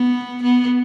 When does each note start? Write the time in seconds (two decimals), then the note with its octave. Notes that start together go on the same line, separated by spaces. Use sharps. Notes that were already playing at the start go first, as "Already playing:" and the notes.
Already playing: B3
0.43 B3